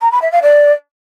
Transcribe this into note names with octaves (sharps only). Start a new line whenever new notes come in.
A#5
B5
E5
F5
D5